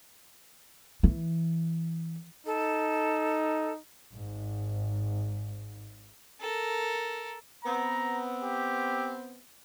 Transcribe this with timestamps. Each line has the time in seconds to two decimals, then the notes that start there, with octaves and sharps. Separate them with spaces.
1.03 E3
2.46 D#4 A4
4.14 G#1 G#2
6.41 A4 A#4
7.64 B3 C4 A#5
8.43 G4